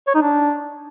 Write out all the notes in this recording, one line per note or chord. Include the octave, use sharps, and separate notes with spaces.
C#5
D#4
D4